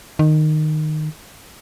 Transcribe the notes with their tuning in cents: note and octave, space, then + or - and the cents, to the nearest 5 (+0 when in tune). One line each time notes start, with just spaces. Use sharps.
D#3 -15